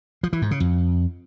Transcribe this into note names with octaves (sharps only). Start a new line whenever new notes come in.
F3
E3
G#2
C#3
F2